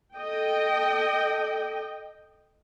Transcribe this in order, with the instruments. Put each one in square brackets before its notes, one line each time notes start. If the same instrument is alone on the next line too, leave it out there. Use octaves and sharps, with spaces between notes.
[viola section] A4 D#5 G5